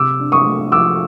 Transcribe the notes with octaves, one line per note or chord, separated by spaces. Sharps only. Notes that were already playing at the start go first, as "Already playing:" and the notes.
Already playing: C3 D6 E6
D4
C#6 D#6
A3
F3 D6 E6